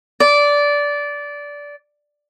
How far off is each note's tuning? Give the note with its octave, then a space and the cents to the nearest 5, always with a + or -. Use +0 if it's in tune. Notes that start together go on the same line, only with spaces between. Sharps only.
D5 -15